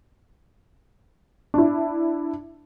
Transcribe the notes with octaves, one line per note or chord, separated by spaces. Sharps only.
D4 E4